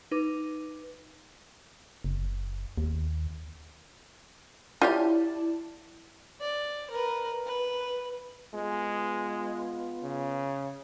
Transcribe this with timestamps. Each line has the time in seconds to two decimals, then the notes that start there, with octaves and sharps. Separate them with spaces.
0.11 D#4 B4 D6
2.04 F#1
2.78 D#2
4.82 E4 F4 G4 C#5 D5 A5
6.41 D5
6.91 A#4 B4
7.46 B4
8.54 G#3 B3 F4
10.02 C#3